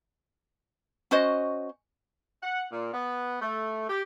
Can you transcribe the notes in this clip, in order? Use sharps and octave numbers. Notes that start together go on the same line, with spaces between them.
C#4 F#4 C5 D#5
F#5
A#2
B3
A3
G4